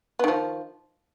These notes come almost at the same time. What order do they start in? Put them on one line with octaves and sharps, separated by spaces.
B3 D#3 F3